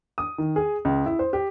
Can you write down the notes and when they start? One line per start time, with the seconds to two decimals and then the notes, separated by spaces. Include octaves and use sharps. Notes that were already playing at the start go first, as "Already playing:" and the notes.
0.18 D#6
0.38 D#3
0.56 G#4
0.85 C#2
1.06 E4
1.19 C5
1.33 G4